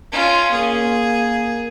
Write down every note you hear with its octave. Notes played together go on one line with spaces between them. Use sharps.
C#4 F4
A#3 G#4